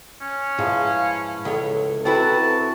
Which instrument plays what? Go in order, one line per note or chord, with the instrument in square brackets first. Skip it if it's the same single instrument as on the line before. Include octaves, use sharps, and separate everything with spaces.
[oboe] C#4
[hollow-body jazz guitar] G#2 [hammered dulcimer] F3 E4 B4 [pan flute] F5
[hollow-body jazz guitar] C#2 C#5 [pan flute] A4
[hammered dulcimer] C3 E3 F#4 [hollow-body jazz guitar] C4 E4 B4 [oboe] A5